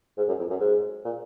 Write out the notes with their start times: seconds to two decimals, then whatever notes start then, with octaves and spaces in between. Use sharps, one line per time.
0.17 G#2
0.28 F#2
0.39 F2
0.50 F#2
0.60 G#2
1.05 A#2